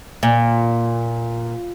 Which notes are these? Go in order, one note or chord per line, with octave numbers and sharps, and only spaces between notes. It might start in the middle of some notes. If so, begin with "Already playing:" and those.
A#2